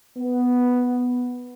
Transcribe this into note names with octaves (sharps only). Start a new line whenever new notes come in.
B3